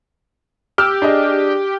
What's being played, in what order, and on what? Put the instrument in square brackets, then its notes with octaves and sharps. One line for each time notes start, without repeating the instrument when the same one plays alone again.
[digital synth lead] G4 [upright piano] E6 F6
[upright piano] D4 G#4 D#5